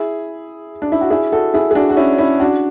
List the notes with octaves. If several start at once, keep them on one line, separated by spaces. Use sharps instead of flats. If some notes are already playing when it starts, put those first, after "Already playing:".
Already playing: E4 G#4
D4
E4
F#4
E4 G#4
F#4 A4
E4 G#4
G#4
D4 F#4
F#4
C#4 E4
C#4 E4
D4 F#4